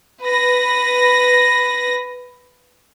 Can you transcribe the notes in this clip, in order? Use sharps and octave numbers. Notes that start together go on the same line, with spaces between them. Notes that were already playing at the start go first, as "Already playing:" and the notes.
B4 A#6